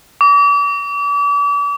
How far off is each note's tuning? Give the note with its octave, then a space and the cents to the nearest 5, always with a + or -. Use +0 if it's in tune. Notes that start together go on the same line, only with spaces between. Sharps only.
D6 -40